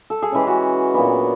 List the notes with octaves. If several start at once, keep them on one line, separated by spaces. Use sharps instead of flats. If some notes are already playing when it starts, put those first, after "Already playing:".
A4
G#4
E3 G#3 C#4 G4
F#4
A#2 F#3 B3 D4